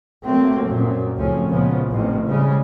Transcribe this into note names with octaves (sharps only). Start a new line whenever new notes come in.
C3 F#3 A3 A#3 C4
F#2 A#2
C#2 A2 F3 C4 C#4
A#2 C#3 F3 G#3 B3
A1 A2 C3 D#3 C4
C#3 G3 G#3